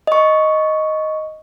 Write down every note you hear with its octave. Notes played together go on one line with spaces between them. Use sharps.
D#5 C#6